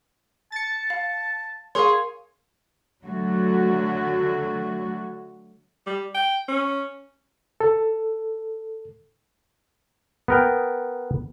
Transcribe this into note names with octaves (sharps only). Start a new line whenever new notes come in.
A5 A6 C#7
F5
G#4 A#4 C#5 F5 C6
D3 F#3 A3 F#4
G3
G5
C#4
A4
B3 A#4 G5